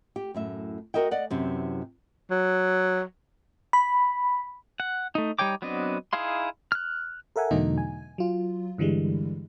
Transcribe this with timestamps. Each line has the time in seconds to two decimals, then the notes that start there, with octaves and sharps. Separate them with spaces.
0.16 G4
0.34 F#2 A2 E5
0.94 F#4 G4 A#4 D#5 E5 G5
1.11 D5 D#5 F#5
1.30 F#2 C3 E3
2.30 F#3
3.73 B5
4.80 F#5
5.15 A3 D#4
5.39 G3 D#4 C#5 G5 D6
5.62 F#3 B3 C4 D4 D#5
6.13 D#4 E4 G#4 F5 C6
6.72 F6 F#6
7.36 A4 A#4 E5 F#5 G#5
7.51 E2 B2 D3 F#3 A3 D#4
7.78 G#5
8.18 F#3 F4
8.78 G2 D3 E3 G3 G#3